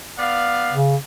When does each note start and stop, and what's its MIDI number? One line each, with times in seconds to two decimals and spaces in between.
0.18 0.75 59
0.18 0.75 74
0.18 0.75 77
0.71 0.96 49